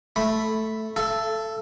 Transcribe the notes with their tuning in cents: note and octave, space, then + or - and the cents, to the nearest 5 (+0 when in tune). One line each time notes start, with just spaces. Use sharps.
A3 +0 B5 +0
A4 +0 E5 +45